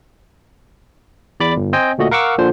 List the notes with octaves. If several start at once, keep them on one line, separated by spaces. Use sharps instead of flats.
E2 D5 B5 D6
G1
C4 C5 D#5 G5 G#5
D2 A#2 A3 F#4 D#5
A#4 F5 F#5 C#6 D6 E6
A#2 D3 F3 C5